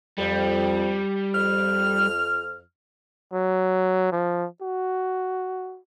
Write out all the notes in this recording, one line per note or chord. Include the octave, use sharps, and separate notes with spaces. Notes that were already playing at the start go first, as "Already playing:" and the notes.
F2 G3
F2 F6
F#3
F3
F#4